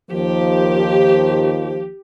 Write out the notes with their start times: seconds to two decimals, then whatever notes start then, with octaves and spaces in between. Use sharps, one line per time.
0.11 D#2 D#3 F3 G4